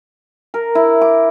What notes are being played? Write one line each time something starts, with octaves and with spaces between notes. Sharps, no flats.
A#4
E4
D6